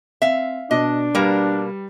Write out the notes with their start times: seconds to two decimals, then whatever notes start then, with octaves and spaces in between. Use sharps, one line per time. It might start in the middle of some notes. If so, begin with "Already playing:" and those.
0.22 C4 E5 F5
0.71 B2 D4 D#5 D6
1.15 B2 G3 A#3 A#4 B4